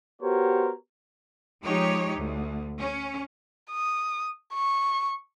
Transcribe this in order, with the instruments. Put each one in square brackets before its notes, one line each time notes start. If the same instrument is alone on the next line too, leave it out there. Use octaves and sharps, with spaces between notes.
[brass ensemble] B3 F#4 G4 A#4 C5 C#5
[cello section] F3 G#3 D#4 G4 C#5
D2
C#4
[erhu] D#6
C#6